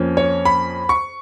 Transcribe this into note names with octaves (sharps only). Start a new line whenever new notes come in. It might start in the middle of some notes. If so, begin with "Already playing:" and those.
Already playing: F2 F3 A#3 C#4
C#5
B5
C#6